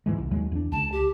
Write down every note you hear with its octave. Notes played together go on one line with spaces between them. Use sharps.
G#2 E3 G#3
C2
D#2 F#3 G#3
E2 D4
C#2 A5
G4